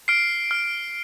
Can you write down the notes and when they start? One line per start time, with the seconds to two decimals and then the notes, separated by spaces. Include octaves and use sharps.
0.08 F6 C7 D7
0.51 F6